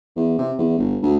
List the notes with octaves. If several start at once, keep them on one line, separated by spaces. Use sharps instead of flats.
E2
C3
E2
G1
D2